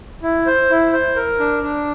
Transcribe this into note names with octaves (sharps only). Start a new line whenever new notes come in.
E4
C5
E4
C5
A#4
D4
D4